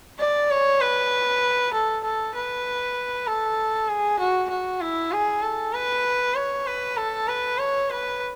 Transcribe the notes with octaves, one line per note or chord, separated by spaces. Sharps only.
D5
C#5
B4
A4
A4
B4
A4
G#4
F#4
F#4
E4
G#4
A4
B4
C#5
B4
A4
B4
C#5
B4